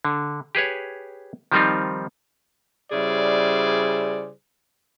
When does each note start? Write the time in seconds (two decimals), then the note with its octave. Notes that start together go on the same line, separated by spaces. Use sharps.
0.05 D3
0.55 G4 G#4 B4 C#5
1.52 D#3 F3 G3 C4 D#4 F4
2.92 C#3 G3 E4 G#4 C5 D5